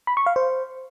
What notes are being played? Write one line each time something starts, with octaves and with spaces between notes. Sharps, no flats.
B5
C#6
F5
C5